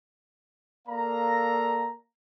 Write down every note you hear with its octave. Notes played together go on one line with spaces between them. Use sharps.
A#3 A4 D5 F5 A#5